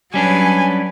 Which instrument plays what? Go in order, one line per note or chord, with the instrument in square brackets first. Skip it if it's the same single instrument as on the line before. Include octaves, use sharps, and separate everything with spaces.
[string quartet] F#3 B4 [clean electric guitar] G3 C#4 D4 [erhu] G#5